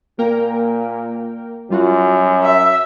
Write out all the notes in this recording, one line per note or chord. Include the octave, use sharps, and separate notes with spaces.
A#2 A#3 A#4 G5
F#2 G3 F4 F#4
E5